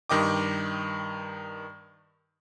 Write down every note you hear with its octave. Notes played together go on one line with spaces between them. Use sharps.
G2 D#3 D#5 G5 D6